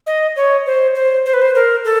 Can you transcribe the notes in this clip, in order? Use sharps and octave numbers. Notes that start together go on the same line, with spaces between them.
D#5
C#5
C5
C5
C5
B4
C5
A#4
A4